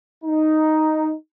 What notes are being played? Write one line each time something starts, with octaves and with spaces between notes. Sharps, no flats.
D#4